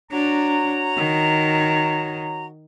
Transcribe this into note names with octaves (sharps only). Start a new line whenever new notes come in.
D4 F#4 C#5 A#5
D#3